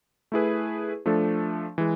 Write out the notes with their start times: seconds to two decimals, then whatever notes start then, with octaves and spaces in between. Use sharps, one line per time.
0.32 A3 E4 G#4 B4
1.06 F3 A3 D4 A4
1.78 E3 G#3